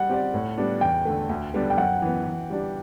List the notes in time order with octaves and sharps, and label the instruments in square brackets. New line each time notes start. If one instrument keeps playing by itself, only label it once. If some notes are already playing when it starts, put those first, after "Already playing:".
Already playing: [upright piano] G3 [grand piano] F#5
[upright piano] C4 G4 D5
A2
G3 B3 D4
[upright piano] E2 [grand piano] G5
[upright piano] D3 A3
D2
D3 G3 B3 D4
[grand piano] G5
[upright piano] F#2 [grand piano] F#5
[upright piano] E3 B3
E3
G3 D4 G4